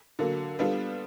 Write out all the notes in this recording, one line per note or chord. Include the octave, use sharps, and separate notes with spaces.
D3 F#3 A#3
G3 B3 D4 F4 A4